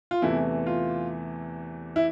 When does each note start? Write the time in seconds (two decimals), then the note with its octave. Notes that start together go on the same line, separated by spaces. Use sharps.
0.11 F4
0.22 E2 C3 E3 A3 E4
0.67 F4
1.96 E4